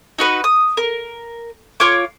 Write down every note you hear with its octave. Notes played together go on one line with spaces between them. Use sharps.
D#4 F#4 B4
D#6
A#4
F4 C#5 D6